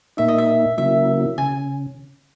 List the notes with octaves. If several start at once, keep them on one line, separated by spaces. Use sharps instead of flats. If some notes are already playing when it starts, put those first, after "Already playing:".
A#2 A#3 D#4 E5
D#5
E5
C#3 F#3 A#3 E4 E5
C#3 G#5